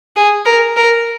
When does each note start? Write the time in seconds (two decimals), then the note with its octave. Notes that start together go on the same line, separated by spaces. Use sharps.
0.16 G#4
0.45 A#4
0.76 A#4